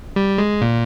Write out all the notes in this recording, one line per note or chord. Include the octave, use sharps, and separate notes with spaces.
G3
G#3
A#2